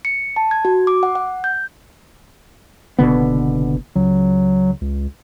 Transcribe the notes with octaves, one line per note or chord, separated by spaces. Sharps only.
C#7
A5
G#6
F#4
D6
F#5
F#5
G6
F#1 B2 D3 B3
C#2 F#3
C#2